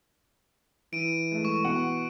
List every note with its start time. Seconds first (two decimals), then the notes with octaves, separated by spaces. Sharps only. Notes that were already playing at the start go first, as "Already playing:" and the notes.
0.93 E3 D7 D#7
1.31 G#3 A3
1.45 C#6
1.64 B2 F#5